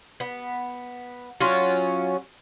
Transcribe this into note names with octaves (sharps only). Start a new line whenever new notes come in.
B3
F#3 C#4 F4